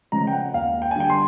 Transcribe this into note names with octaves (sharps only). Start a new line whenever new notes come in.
C#3 F3 G#3 A#5
G5
F#5
D#2 F5
G5
G#5
D3 G3 G5
C6